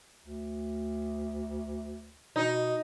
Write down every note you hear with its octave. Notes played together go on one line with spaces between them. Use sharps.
D2
B2 D#4